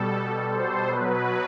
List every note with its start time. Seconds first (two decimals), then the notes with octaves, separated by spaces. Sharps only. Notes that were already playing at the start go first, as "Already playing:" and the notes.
Already playing: B2 G3 A4
0.51 C5
0.88 B2 F#3 B4